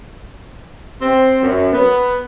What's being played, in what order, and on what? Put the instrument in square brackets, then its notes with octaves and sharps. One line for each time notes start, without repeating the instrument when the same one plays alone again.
[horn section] C4
F#2
B3